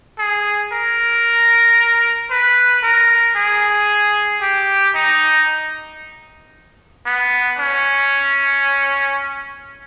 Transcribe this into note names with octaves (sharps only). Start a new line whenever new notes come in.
G#4
A#4
B4
A#4
G#4
G4
D#4
B3
C#4